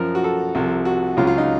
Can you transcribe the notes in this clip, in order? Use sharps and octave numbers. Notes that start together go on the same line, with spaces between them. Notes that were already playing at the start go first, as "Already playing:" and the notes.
Already playing: F#2 F3 A#4
F#4
A4
C2 C3 F3
F#4
C#2 C#3 F#3 F4
F4
D#4